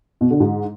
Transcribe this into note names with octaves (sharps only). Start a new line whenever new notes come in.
B2
D3
G#2